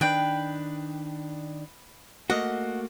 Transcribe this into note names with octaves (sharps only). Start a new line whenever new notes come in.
D#3 D4 B4 G5
A3 A#3 F#4 D#5 F#5